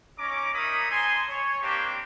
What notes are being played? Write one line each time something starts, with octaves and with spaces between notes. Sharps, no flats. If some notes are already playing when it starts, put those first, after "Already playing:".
C#4 D#4 A#5 D6
D#4 A#4 C#5 E5 B5 D#6
D#4 C5 G#5 A5 C6
C#5
A#3 C4 D4 G4